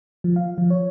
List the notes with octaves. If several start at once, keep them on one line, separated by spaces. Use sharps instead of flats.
F3
F5
F3
C#5